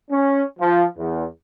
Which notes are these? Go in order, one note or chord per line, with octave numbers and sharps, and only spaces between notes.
C#4
F3
E2